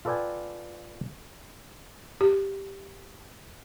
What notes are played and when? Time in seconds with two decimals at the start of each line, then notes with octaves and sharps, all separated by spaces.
0.05 F4 A4 B4 D5 G5 G#5
2.21 G4